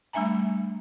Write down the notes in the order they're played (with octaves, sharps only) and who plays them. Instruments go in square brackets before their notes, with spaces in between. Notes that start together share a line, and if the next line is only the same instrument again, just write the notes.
[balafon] G3 A3 D4 E5 G#5 A#5